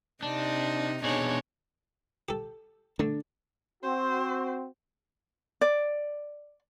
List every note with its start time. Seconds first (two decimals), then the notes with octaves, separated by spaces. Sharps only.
0.23 C3 C4 D4 D#4
1.04 B2 D4 D#4 G#4 C#5
2.29 G4 A4
2.99 D3 A3 D4
3.83 C4 F#4 C5
5.61 D5